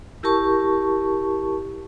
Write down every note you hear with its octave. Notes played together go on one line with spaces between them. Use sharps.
E4 G4 A#4 A5 C#6